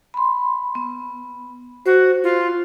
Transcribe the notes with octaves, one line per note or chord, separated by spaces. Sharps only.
B5 C6
B3
F#4 C5
F4